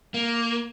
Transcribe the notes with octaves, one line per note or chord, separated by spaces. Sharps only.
A#3